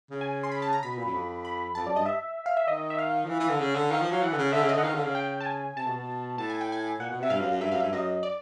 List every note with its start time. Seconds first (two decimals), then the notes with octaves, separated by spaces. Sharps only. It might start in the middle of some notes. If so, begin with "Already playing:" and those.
0.11 C#3
0.21 G#5
0.43 C6
0.51 B5
0.62 A5
0.73 A#5
0.83 B2 B5
0.98 A#2
1.06 F#2
1.13 F2
1.45 B5
1.75 F2 A5
1.86 F#2 D5
1.96 G2 D#5
2.06 E5
2.46 F5
2.57 E5
2.68 D#3 D#5
2.90 E5
2.99 F5
3.24 F3
3.29 E3
3.40 E3
3.50 D3
3.60 C#3
3.75 D3
3.91 D#3 F5
4.01 F3
4.11 F#3 F5
4.22 E3 F#5
4.33 D3
4.37 C#3
4.53 D3 E5
4.63 C#3
4.69 D3 D#5
4.78 F#5
4.84 D#3 F5
4.94 D3
5.04 C#3
5.15 G5
5.40 A5
5.45 G#5
5.76 C3 A5
5.86 B2
5.97 B2
6.37 A2 A5
6.50 G#5
6.61 G5
6.72 G#5
7.00 A#2 F#5
7.10 B2
7.20 C3 E5
7.30 G2 F5
7.41 F#2
7.51 F#2
7.61 G2 E5
7.71 F#2 F5
7.80 G2 E5
7.92 F#2 D#5
8.23 D5